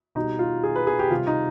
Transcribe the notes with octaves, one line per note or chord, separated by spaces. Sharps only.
B2 G3 D#4
F4
G#4
B4
G#4
G4
C3 G3 F4
D#4